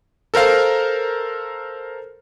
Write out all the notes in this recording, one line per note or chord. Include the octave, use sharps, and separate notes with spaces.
A4 A#4 C5 F5